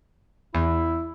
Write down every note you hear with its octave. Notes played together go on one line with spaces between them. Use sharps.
E2 E4